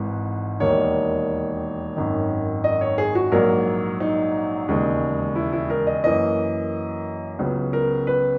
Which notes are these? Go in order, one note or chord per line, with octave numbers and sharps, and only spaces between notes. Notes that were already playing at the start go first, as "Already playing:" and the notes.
Already playing: G#1 G#2 E3
E1 D#2 D#3 A#3 C#5
G#1 F#2 D#3
D#5
C#5
G#4
F#4
A#1 G#2 F#3 A#3 A#4
D#4
E1 D#2 C#3 G#3
E4
E4
A#4
D#5
F#2 E3 A#3 D#5
C#2 C#3 F#3 B3
A#4
B4